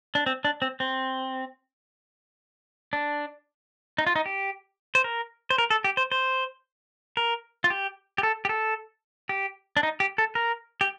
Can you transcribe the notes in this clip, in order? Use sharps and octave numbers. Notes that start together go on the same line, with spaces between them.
D4
C4
D4
C4
C4
D4
D#4
F4
D#4
G4
C5
A#4
C5
A#4
A4
G4
C5
C5
A#4
F4
G4
G4
A4
G4
A4
G4
D4
D#4
G4
A4
A#4
G4